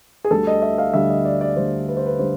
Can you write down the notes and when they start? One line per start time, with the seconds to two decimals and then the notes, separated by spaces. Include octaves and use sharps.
0.24 G#4
0.30 D2 D3 G3 A4
0.47 D#5
0.62 E5
0.78 F5
0.93 D2 D3 G3 E5
1.10 D#5
1.25 D5
1.41 D5
1.56 D2 D3 G3 C5
1.88 B4
1.97 C5
2.06 B4
2.19 D3 G3 C5